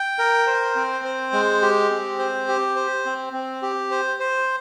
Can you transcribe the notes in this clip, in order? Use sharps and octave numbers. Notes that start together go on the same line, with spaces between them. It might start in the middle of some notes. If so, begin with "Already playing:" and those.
Already playing: G5
A#4
C5
C4
C5
G#3
G4
C4
C5
G4
C5
C4
C4
G4
C5
C5